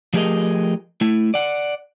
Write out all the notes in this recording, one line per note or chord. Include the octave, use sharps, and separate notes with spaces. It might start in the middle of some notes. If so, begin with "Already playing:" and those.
F3 A3 G4 G#4 A#4 D#5
A3 E4
D5 F#5